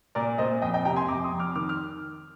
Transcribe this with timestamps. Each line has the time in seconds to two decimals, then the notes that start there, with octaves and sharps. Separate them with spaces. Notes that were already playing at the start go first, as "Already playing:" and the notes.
0.15 A#2 A#4 D5
0.38 A#2 C5 D#5
0.62 F2 D#5 G5
0.74 D#5 G5
0.85 C3 G5 A#5
0.96 G#5 C6
1.08 F2 A#5 D6
1.24 C6 D#6
1.32 F2
1.40 D6 F6
1.55 D#3 D6 F6
1.69 F6